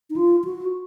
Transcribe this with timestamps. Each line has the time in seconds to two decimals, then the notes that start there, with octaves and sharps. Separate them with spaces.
0.10 D#4
0.16 F4
0.45 F#4